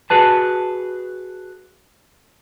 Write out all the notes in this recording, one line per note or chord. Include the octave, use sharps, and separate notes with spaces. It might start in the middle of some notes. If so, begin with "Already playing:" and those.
F#4 G#4 B4 A5